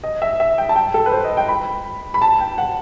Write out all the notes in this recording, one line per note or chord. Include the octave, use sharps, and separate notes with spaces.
D#5
E5
E5
G5
A5
G5
A4
B4
C5
D#5
G5
B5
B5
A5
G5
F#5